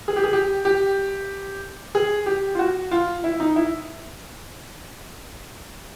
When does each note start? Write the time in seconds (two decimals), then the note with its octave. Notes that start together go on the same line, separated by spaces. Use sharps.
0.08 G#4
0.16 G4
0.24 G#4
0.33 G4
0.65 G4
1.95 G#4
2.26 G4
2.55 F4
2.59 F#4
2.91 F4
3.24 E4
3.40 D#4
3.56 E4